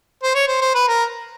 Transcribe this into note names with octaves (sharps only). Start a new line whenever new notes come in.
C5
C#5
C5
C5
B4
A#4